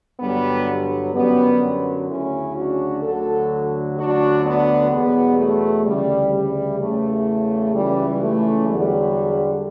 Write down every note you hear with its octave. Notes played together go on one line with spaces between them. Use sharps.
G2 D3 F#3 G3 B3
F#2 D3 F#3 G3 B3
D2 C#3 F#3 C#4 E4
D4 F#4
D2 D3 F#3 F#4 A4
D2 D3 F#3 D4 F#4
B3 D4
E2 B2 F#3 G3 B3
A3
D2 C#3 E3 G3
G3
E2 C#3 E3 A3
C#2 C#3 E3 G3
A3
E2 D3 F#3 G3